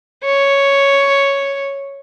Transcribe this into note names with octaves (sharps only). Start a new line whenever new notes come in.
C#5